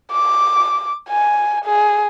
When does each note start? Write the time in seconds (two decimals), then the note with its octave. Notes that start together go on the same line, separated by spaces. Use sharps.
0.12 D6
1.09 G#5
1.65 G#4